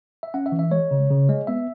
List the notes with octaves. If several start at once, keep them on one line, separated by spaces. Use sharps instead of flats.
E5
C#4 F#5
E5
E3
E5
G#3 C#5
C#3
C#3
G#3
B3 E5